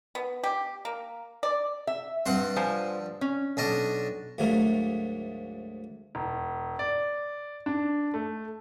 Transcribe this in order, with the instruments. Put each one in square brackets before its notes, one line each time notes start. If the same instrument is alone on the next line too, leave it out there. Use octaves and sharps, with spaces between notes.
[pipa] B3
G4
A#3
D5
[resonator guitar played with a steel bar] E5
[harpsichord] G2 F#5 C6 [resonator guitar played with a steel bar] C4
[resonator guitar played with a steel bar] F3 C5 G#5
C#4
[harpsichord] B1 D4 D#5
D2 G#2 F#3 A3 A#3
[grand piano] E1
D5
D4
A3